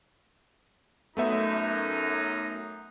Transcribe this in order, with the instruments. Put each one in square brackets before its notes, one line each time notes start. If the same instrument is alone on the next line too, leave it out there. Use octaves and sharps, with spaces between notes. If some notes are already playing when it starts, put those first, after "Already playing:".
[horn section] F#2 D#4 [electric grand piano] A3 B3 E5